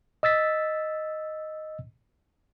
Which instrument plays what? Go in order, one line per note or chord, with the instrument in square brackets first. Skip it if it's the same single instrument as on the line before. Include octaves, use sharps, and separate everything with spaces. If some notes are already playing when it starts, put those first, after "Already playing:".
[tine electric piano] D#5 E6 A6 B6